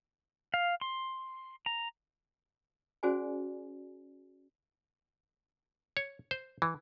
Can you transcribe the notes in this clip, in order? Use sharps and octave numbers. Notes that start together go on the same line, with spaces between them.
F5
C6
A#5
C#4 F#4 G#4 C5 D5 G#5
C#5
C5
E3